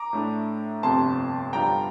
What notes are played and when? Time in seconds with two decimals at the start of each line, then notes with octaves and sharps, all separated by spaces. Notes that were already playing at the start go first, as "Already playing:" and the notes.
Already playing: A#5 D6
0.13 A2 A3 D4
0.83 G1 F2 C3 A5 C6
1.53 G2 D3 G3 D4 F4 G5 A#5